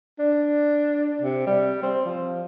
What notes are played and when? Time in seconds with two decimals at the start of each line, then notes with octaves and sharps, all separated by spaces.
0.19 D4
1.22 C3
1.47 G3
1.83 C4
2.05 F3